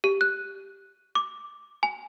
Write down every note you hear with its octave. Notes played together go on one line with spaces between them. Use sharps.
G4
F#6
D6
G#5